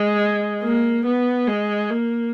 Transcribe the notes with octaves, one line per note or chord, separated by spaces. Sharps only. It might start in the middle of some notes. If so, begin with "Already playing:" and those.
Already playing: G#3
A#3
B3
G#3
A#3